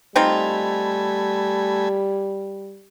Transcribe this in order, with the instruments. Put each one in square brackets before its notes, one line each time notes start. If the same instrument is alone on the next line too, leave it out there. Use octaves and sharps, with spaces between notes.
[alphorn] G3 [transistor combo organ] A3 G#5 B5 [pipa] C4 D#4 F4